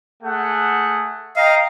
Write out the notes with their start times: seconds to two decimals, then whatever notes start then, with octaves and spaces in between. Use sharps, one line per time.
0.23 A3 G#4 F#5
1.36 D#5 F5 G5 A#5